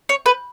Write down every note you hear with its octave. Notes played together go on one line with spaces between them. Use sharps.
C#5
B4